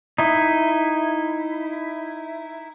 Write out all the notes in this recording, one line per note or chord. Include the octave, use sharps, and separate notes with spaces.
D#4 E4